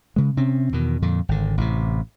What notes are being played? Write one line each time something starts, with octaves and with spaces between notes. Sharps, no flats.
C#3 G#3
C3 C4 C#4
E2 B2 D#3
F2 A#2 D3
G#1 D3
A1 A2 C3